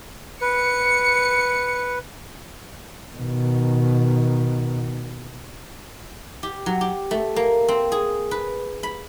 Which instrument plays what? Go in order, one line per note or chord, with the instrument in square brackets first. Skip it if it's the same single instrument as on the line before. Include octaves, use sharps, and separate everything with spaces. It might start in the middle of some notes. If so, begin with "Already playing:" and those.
[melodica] B4 [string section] C#7
[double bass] B2 D#3
[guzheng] G4
F#3
G4
A3
A#3
C4
G#4
B4
B5